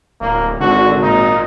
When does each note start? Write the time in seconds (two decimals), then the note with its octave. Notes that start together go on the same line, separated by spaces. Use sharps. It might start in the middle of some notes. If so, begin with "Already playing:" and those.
0.21 D1 A#3
0.61 G#1 D3 F#4
1.02 A#2 D#4